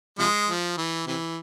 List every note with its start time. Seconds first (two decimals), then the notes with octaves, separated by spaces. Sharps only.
0.19 C3 F3 G#3
0.48 F3
0.77 E3
1.07 C3 E3